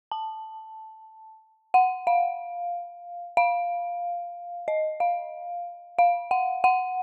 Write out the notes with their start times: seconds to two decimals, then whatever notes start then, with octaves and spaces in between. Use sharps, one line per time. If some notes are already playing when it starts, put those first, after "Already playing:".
0.11 A5
1.74 F#5
2.07 F5
3.37 F5
4.68 D#5
5.00 F5
5.99 F5
6.31 F#5
6.64 F#5